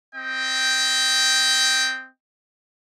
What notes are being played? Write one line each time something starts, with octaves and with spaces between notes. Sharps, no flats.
C4 D#5 G5